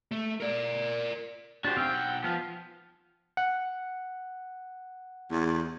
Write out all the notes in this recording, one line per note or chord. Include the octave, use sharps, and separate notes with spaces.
A3
A#4 D5
D4 F#4 G4 C5
B1 F#3 C4 F5 G5
F#5
F3 B3 F5
F#5
E2